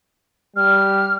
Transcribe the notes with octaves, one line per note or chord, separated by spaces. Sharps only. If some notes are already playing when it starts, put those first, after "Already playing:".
G3 F6